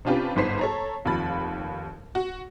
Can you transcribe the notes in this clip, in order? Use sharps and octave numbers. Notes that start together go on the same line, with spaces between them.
C3 C#4 D4 F4 G4 B4
G1 G#2 B4 C5 B6 C7
A4 C#5 A#5
F1 D#2 F4 B5 A6
F#4